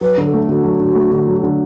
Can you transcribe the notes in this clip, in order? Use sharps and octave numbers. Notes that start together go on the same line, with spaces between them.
F#3 B4
D3
A4
A3
D3 F#4
F#3
D3
A3
D3
F#3
D3